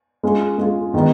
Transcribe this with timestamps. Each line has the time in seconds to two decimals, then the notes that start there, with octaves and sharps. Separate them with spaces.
0.23 G#3 C#4 F4 G#4
0.58 G#3 C#4 F4 G#4
0.94 D#3 G#3 B3 D#4